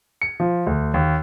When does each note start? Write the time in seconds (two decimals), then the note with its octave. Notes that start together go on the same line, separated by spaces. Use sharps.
0.21 C#7
0.40 F3
0.66 D2
0.94 D#2